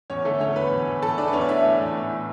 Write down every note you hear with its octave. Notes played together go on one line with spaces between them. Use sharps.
E2 C#4 C#5
D3 A3 A4
E2 C#4 C#5
E2 B4 B5
E2
E2
E2 A4 A5
E2 D4 D5
B4
E2 C#4 C#5
D5
A3 E4 E5
A3
E2
A2
A2